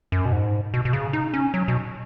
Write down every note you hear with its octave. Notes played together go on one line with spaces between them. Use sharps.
F#2
B2
G#2
B2
B2
C#3
D#4
C#4
F#3
B2